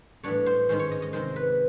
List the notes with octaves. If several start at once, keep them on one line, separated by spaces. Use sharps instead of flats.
A2 E3 G3 B3 D4 C#5
C5
G#2 D#3 G#3 C#4 C5
C#5
D#5
D#5
C3 D#3 G#3 C5
B4